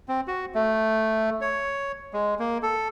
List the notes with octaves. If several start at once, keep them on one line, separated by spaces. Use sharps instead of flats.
C4
F#4
A3
C#5
G#3
A#3
A4